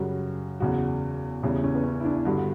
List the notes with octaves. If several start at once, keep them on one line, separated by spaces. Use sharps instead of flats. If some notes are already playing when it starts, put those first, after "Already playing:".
Already playing: F#2 C#3 G3 F#4
E2 C#3 F#3 F#4
E2 C#3 G3 E4
C#4
B3
C#4
E4
D4
G2 D3 G3 F#4